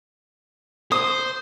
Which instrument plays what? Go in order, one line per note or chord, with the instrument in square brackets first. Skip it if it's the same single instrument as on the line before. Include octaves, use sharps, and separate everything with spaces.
[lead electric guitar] C5 [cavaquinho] D#6